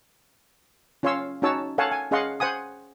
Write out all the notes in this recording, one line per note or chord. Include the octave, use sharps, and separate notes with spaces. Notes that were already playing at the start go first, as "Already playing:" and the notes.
C#4 F4 C#5 F5 C6 E6
C#4 D#4 F#4 C#5 A5 E6
A4 C#5 F5 F#5 G#5 A5
G#5
C#4 G#4 D#5 F5 F#5 C6
C5 F#5 G#5 D#6